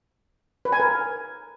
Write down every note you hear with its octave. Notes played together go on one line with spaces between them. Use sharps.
B4
G#5
A#4